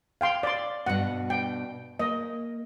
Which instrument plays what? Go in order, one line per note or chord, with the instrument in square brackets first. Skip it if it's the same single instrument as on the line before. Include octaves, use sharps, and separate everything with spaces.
[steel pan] F5 G5 C6
D5 C6
[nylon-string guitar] G2 B2 [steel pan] F#5
[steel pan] G5
[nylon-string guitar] A#3 [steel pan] D#5